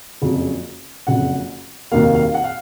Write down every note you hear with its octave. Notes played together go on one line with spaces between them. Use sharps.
F#1 F2 C#3 F#3
F#1 F2 C#3 F#3 F#5
F1 D#2 D#3 F#3 A#3 F5
F5
F#5
F5